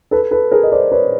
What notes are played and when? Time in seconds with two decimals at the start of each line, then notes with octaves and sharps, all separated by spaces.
0.11 A4 B4
0.31 A4 B4
0.52 G#4 A#4
0.63 D#5
0.72 C5 D5
0.92 B4 C#5